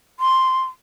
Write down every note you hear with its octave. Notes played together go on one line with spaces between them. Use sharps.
C6